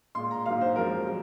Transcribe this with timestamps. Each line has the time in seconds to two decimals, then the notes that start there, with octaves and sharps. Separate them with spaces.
0.15 A#2 G#3 C6
0.31 A#5
0.46 G#2 F#3 A#3 F5
0.61 C5
0.76 F#2 F3 G#3 A#4
1.06 C3 F#3